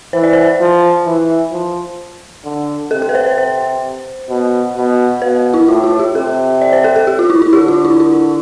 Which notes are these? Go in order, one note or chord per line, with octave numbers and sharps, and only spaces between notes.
E3 C5
D5
C5
F3
E3
F3
D3
C3 A4
A4
B4
C5
C5
C5
B2
B2
B2 B4
E4
A2 F4
F4
G4
C3 A4
D5
C5
A4
A4
G4
F4
E4
E4
D3 G4
F4
E4
E4